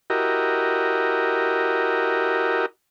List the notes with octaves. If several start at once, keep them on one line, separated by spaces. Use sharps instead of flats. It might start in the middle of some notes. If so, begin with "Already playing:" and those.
E4 F#4 G4 A#4 D#5